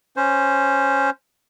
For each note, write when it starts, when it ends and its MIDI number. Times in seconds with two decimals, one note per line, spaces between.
0.16 1.10 61
0.16 1.10 72